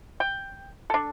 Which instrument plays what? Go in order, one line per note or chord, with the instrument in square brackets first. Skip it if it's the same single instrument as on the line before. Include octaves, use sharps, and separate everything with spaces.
[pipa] G5
D4 A4